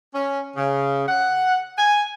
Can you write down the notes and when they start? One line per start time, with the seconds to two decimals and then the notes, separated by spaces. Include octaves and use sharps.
0.13 C#4
0.57 C#3
1.08 F#5
1.78 G#5